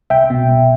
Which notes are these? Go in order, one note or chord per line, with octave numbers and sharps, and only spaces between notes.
C2 E5 G5
B2
C2